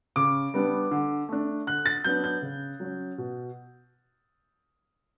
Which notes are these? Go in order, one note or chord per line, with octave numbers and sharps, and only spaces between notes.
C#3 D6
G3 B3 D4
D3
A3 D4
D3 F#6
A6
F#3 B3 D4 G6
G6
C#3
F#3 C#4
B2